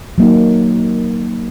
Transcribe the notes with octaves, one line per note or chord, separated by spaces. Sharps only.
F#3 A#3 D#4